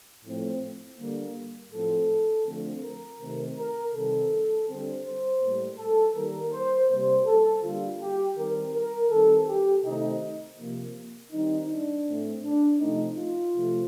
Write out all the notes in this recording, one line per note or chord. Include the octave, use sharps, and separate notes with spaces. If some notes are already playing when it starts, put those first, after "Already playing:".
A2 F3 A3 C4
D3 G3 A#3
A2 F3 C4 A4
D3 F3 A3 C4
A#4
C3 D#3 A3 C4
A#4
C3 D#3 G3 C4 A4
D3 G3 C4
C5
A2 G3 A#3
A4
D#3 G3 A#3 A#4
C5
C3 G3 A#3 C5
A4
D3 G3 A#3 F4
G4
D#3 G3 C4 A#4
A#4
D#3 G3 C4 A4
G4
C3 D#3 A3 C4 D#4
C3 F3 A#3
D#3 G3 C4 D#4
D4
A2 A3 C4
D4
C3 F3 A3 C4 D#4
F4
C3 F3 A3